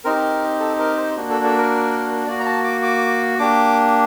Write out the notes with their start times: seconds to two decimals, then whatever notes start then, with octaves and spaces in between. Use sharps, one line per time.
0.05 C4 D#4 G4 A#4
0.60 A4
0.79 A#4
0.97 C5
1.16 A#3 D4 F#4
1.30 A4
1.44 A4
1.58 A#4
2.27 A#3 F#4 D5
2.40 A#5
2.46 A5
2.64 D6
2.83 D6
3.39 A#3 D4 G4 D6